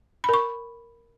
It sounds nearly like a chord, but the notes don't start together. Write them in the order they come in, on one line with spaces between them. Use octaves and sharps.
B5 A#4 C#6